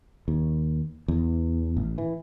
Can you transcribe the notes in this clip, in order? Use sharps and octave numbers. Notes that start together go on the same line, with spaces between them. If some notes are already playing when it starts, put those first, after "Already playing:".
D#2
E2
A1
E3